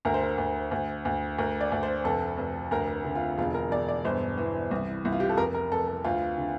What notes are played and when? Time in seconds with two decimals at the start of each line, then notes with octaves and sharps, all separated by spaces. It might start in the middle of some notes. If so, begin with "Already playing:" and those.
0.05 D2 A#4
0.14 C5
0.23 A#4
0.38 D2
0.71 D2
1.05 D2
1.38 D2 A#4
1.61 D5
1.72 D2
1.83 C5
2.04 F1 A4
2.38 F1
2.71 D2 A#4
3.05 D3
3.15 F4
3.38 E1 F4
3.54 A#4
3.71 E1 D5
3.88 D5
4.05 G1 C5
4.37 E3
4.71 C2
5.05 C2
5.13 F4
5.20 G4
5.30 A4
5.37 F1 A#4
5.54 A#4
5.72 F1 A4
5.88 A4
6.05 D2 F4
6.38 D3